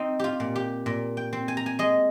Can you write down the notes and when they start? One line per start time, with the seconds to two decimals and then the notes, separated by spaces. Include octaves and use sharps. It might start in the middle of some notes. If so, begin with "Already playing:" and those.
Already playing: C4 D#4
0.19 F4 G4
0.40 A#2
0.56 G4
0.86 A#2
1.17 G5
1.33 C4
1.48 G#5
1.57 A#5
1.66 G#5
1.79 G#3 D#5